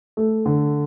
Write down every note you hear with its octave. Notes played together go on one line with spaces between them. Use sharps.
A3
D3